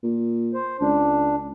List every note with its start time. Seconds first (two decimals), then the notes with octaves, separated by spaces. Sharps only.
0.03 A#2
0.54 C5
0.81 C#2 D4